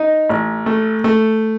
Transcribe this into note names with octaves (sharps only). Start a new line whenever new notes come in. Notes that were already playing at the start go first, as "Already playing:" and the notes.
Already playing: D#4
A1
A3
A3